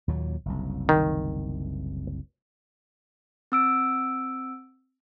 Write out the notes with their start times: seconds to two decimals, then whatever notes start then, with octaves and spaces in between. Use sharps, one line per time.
0.08 D#2 A#2 F#3
0.45 F#1 C2
0.89 D#3
3.52 C4 E6 D7